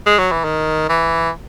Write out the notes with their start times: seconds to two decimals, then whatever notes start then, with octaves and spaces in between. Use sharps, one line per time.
0.06 G#3
0.19 F#3
0.32 E3
0.44 D#3
0.89 E3